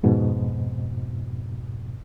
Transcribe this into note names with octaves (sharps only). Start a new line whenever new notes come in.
F2 G#2 B2